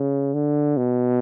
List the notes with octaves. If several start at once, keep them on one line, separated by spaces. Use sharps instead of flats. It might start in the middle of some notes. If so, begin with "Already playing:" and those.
Already playing: C#3
D3
B2